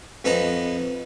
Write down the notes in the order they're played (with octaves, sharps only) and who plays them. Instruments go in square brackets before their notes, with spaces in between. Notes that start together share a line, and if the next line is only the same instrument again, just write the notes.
[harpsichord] F2 B3 D#4 A5 A#5